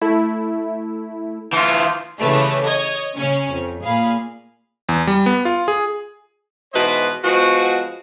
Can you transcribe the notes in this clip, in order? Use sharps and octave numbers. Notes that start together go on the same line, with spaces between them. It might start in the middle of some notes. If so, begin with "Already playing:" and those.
A3 E4
E3 F4
C#3 E3 A3 G4 B4 C#5
C#5 D#5 D#6 G#6
C#3 C#4
F2
A#2 G#4 F5 B5
E2
G3
B3
F4
G#4
G#2 B2 E3 B4 C5 D#5
F3 G#3 B3 F#4